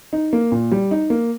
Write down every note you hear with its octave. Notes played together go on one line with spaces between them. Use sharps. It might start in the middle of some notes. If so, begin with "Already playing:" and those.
D#4
A#3
A#2
G3
D#4
A#3